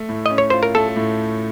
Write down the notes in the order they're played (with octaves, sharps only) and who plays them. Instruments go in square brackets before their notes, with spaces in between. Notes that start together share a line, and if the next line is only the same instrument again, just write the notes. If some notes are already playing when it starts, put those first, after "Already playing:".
Already playing: [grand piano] A3
A2
[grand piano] C#4 [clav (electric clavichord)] D#5
[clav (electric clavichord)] C#5
[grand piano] F4 [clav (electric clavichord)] C5
[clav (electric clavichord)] A#4
[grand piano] A3 [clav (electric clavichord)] A4
[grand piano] A2